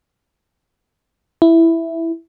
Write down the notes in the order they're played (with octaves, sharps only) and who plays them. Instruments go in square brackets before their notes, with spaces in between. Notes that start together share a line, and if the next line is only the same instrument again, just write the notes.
[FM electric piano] E4